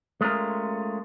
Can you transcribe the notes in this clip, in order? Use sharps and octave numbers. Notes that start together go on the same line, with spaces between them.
G#3 A3 C#4 F4 A#4